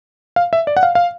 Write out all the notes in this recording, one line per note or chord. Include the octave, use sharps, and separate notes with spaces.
F5
E5
D5
F#5
F5
F5